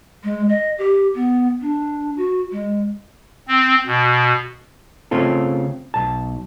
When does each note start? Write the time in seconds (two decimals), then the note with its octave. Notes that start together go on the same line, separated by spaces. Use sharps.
0.24 G#3
0.49 D#5
0.78 G4
1.15 B3
1.62 D4
2.17 F#4
2.52 G#3
3.48 C4
3.87 B2
5.11 C#3 A3 C4 F4 A4
5.94 B1 A5